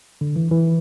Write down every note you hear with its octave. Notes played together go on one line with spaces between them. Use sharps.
D3
E3
E3